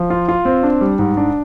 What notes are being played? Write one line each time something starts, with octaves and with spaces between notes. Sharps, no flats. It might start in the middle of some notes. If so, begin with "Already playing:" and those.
Already playing: F3
F4
F4
C4
D4
G3
G#2
D4